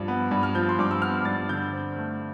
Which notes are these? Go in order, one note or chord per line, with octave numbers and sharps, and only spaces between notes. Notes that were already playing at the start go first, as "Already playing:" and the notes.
Already playing: G2 F3
B3
G2
F6
F3 G6
C6
G2 D6
E6
B3 F6
G2 A6
D3 G6
C4
A3